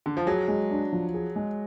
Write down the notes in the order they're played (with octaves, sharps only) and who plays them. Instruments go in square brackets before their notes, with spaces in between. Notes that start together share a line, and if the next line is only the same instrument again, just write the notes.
[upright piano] D3
F3
[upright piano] F#3 [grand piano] G#4
[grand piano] G#3
D4
F3
G#4
G#3